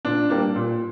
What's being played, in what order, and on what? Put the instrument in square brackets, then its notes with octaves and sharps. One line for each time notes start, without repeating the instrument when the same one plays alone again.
[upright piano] A#2 D4
G3 A#3 D4
A#2